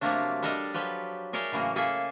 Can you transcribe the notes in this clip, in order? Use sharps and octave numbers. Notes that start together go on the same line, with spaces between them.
C3 F3 F#3 A3 A#3 D4
G3 D4 A4 A#4 D#5
F3 F#3 G4 B4
G#4 A#4 C#5 D5 E5 G5
A2 C#3 E3 F#3 A#3
A#3 G#4 A4 E5